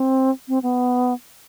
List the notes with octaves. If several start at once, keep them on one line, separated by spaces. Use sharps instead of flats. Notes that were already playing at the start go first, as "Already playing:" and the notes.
Already playing: C4
C4
B3